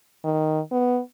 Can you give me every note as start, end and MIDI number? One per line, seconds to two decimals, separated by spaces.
0.24 0.60 51
0.71 0.99 59